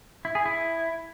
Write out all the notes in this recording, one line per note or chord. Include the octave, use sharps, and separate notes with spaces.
E4
G#4
E4